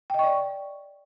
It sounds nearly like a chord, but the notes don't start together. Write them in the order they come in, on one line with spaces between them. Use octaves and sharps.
G5 D#5 C#6 D5